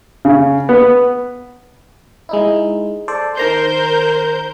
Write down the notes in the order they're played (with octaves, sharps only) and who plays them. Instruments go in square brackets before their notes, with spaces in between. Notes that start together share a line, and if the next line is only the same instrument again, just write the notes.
[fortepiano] C#3
B3
[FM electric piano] G#3 D#4 E4
A4 C5 D5
[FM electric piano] D#3 A#5 C6 [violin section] A#4 C5 G6